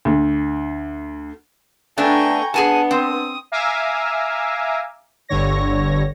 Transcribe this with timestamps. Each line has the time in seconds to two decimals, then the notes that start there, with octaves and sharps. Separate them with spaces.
0.05 D2
1.98 A3 B3 D4 G5 G#5 A#5 C#6
2.54 B3 D4 G#4 F#5 G#5 A5
2.91 C4 D#6
3.52 E5 F5 G#5 A#5 D6
5.29 G1 G2 D3 C#5 A#6